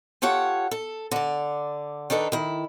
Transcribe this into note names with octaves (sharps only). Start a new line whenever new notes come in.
F4 G4 A4 C#5 F#5
A4
D3 D5
D#3 D4 D#4 A4 B4
D#3 E4